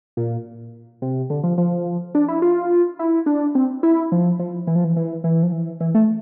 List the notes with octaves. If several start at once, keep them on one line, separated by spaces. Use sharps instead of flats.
A#2
C3
D3
F3
F3
D4
E4
F4
E4
D4
C4
E4
F3
F3
E3
F3
E3
E3
E3
F3
E3
E3
A3